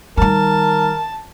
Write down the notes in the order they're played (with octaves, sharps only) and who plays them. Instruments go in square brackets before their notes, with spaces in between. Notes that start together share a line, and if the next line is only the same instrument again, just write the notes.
[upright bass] D#3 G3 [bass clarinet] A#4 [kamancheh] A5